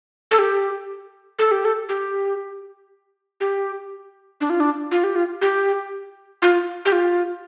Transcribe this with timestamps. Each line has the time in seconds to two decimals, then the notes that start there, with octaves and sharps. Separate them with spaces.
0.31 A4
0.39 G4
1.39 A4
1.51 G4
1.65 A4
1.89 G4
3.41 G4
4.41 D4
4.50 F4
4.60 D4
4.91 F4
5.04 G4
5.15 F4
5.42 G4
6.42 F4
6.85 G4
6.92 F4